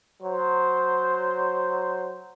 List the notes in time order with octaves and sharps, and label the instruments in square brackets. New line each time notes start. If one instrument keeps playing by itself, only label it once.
[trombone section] F#3 C5